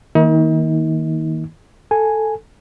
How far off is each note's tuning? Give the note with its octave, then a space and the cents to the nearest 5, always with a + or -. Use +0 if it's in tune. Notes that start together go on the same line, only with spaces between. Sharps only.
D#3 +25 A#3 +0 D#4 +40
A4 +0 G#5 +0